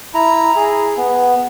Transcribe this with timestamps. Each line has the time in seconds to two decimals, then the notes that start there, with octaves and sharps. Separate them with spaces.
0.14 E4 A#5
0.56 G#4
0.97 B3